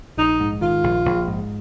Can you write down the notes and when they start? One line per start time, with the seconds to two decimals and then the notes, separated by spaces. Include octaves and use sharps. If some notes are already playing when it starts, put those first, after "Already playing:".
0.17 A#1 D#4
0.40 G#2
0.61 D#3 F4
0.84 A#1
1.05 A#1
1.28 G#2